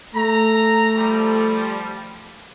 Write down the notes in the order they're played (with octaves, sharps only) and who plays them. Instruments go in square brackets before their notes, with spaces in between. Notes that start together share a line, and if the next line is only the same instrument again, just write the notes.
[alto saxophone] A3 [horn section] A#5
[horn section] F3 G3